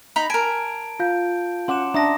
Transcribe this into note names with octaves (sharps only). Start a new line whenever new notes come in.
D#4 A#5 B5
A#4 G#5 A5 D7
F4 F5 G6
C#4 F#5 C6 D6 E7
D4 E5 A5 A#5 D#6 A#6